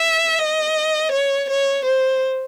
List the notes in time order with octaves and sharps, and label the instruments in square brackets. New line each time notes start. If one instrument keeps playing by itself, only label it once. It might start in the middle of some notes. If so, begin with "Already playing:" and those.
Already playing: [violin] E5
D#5
C#5
C#5
C5